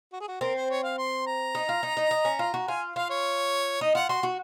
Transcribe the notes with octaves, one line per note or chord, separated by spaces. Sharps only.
F#4
G#4
F#4
C4 A#4
C5
C#5
F5
C6
A#5
D#4
F4
D#4
D#4
D#4
C#4
F4
F#4
F4 G#5
F4 F5
C#5
D#4 D#5
F4 F#5
F#4 C6
F#4